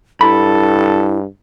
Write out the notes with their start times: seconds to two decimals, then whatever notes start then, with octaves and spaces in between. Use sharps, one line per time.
0.21 G2 E4 A4 B5